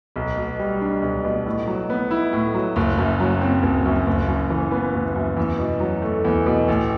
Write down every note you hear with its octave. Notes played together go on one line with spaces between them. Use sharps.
B1
B2
G3
D4
B1
B2
A2
F#3
B3
E4
A2
F#3
F#1
F#2
F#3
C4
F#1
F#2
F#1
F#2
E3
B3
F#1
F#2
E2
B2
F#3
A3
E2
B2
A1